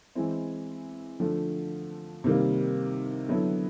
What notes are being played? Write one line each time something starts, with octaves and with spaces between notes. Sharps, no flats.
E3 G#3 C4 E4
D3 F3 A3
C3 D#3 G3 A#3
D3 F#3 B3 E4 A4